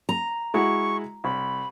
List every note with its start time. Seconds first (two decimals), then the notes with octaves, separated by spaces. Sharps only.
0.09 A#5
0.54 G#3 E4 F#4 C#6
1.24 C2 B5